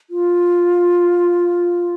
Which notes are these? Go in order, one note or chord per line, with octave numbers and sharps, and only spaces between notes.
F4